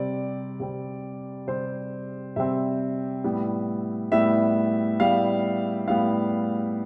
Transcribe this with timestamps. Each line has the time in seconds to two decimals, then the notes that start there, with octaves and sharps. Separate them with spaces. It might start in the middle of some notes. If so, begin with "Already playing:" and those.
Already playing: C3 G3 C4 D5
0.60 C3 G3 C4
1.47 C3 G3 C4 C5
2.36 C3 G3 C4 E5
3.24 A2 G3 B3
4.11 A2 G3 B3 E5
5.00 A2 G3 B3 F5
5.88 A2 G3 B3 F5